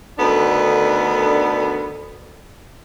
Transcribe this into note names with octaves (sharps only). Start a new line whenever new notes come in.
D2 D3 D#3 B3 D4